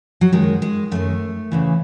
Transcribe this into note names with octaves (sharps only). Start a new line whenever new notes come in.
F#3
F#2 D#3 G#3
G#3
F#2 D#3 A3
E2 C#3 E3